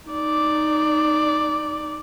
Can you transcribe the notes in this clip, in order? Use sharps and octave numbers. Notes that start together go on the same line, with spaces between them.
D#4 D5